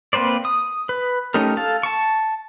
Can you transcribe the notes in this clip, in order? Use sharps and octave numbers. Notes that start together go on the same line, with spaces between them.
A#3 C4 B4 C5 D5
D#6
B4
A3 C#4 D#4 G4 A#4
A4 F5 A5
A5 C#6